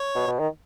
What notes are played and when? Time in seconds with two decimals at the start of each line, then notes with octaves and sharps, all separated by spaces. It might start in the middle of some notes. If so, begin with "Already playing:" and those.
Already playing: C#5
0.15 B2
0.28 B2
0.39 D#3